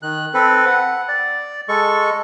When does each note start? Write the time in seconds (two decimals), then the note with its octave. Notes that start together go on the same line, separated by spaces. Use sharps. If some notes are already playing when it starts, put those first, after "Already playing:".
0.02 D#3 F#6
0.34 C4 A4 B4
0.66 F#5
1.08 D5
1.69 G#3 A4 C#6